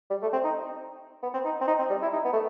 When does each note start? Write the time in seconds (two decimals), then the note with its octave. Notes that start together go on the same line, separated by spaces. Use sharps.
0.10 G3
0.22 A3
0.33 C4
0.44 D#4
1.23 B3
1.34 C4
1.45 D#4
1.61 C4
1.68 D#4
1.79 C4
1.90 G3
2.02 E4
2.13 D#4
2.25 B3
2.33 A3